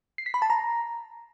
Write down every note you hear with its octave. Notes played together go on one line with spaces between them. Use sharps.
C7
B6
B5
A5
A#5